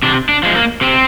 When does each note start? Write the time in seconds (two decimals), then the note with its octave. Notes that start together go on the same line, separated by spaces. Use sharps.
0.03 C3 D4
0.29 D4
0.43 F3 G#3
0.56 A#3
0.81 C3 C4